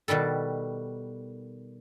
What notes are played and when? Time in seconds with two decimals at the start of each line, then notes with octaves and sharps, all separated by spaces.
0.08 B2 D#3 G3 A4